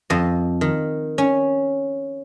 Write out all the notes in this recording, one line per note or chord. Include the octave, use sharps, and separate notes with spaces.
F2 D#5
D#3
C#4